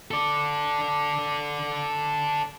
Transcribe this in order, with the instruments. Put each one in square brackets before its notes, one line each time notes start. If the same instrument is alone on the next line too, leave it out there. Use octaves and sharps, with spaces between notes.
[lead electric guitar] A4 D5